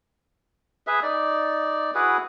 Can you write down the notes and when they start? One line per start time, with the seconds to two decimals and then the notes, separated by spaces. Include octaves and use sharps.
0.87 G#4 B4 E5
1.03 D#4 D5
1.95 E4 F#4 G#4 B4